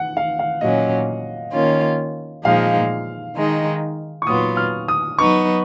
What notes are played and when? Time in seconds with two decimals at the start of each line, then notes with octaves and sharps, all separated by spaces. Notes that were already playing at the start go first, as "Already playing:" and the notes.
Already playing: F#5
0.17 F5
0.39 F5
0.61 A#2 F#3 C#4 D#5
1.53 D#3 A#3 C#4 F4
2.44 A#2 F3 G#3 D#4 F5
3.36 D#3 G#3 D#4
4.22 C#6
4.27 A#2 F#3 B3 F4 D#6
4.57 F6
4.88 D#6
5.19 F#3 B3 D#4 C#6